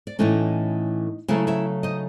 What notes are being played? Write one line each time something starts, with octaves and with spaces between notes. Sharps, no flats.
D5
A2 E3 A3 C#4 D#4 D#5
C#3 F#3 A3 C#4 E4 E5
E4 E5
D#4 D#5